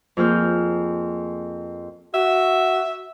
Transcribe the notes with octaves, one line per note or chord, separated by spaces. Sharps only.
F2 A#3 G#4 F6 G6
F#4 E5